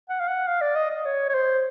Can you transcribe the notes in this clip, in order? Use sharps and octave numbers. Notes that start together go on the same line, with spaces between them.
F#5
F5
F#5
F5
D5
D#5
D#5
C#5
C#5
C5